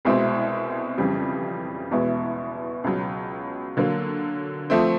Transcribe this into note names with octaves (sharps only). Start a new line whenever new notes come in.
C2 B2 G#3 C4 E4
F2 C#3 E3 G3
E2 B2 G#3 B3 E4
C#2 B2 F#3
D3 F#3 A#3
F3 A3 C4